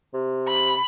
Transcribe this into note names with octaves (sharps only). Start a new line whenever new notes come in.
C3
B5